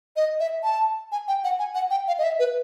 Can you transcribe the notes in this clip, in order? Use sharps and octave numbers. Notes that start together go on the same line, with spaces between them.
D#5
E5
A5
G#5
G5
F#5
G#5
F#5
G5
F5
D#5
E5
B4